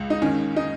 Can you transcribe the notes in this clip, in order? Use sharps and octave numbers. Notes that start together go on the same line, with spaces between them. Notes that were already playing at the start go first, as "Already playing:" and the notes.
Already playing: C#2
D#4
D#3 C#4
D#4